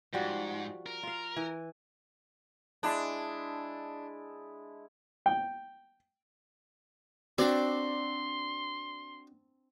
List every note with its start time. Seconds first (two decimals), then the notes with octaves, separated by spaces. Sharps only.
0.13 G#2 F3 G3 F#4
0.86 A#4
1.03 F4 F5
1.36 E3
2.83 G#3 D4 E4 A5
5.26 G5
7.38 C4 D4 F#4 D5 C6